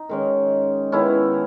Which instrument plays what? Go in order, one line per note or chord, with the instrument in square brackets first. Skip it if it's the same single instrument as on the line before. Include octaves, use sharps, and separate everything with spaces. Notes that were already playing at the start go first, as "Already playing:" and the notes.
Already playing: [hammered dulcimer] D#4
D#3 G#3 C#4
D#3 G#3 B3 C#4 E4